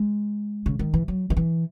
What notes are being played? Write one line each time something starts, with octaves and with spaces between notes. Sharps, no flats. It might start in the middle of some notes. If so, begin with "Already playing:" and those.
Already playing: G#3
C#3
D#3
E3
F#3
D#3
E3